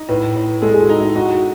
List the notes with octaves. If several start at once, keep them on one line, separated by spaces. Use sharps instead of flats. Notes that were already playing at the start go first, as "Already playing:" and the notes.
Already playing: D#4
A2 B4
A2
G#3 A4
G#4
F#4
D#4
E4
D#4 F#4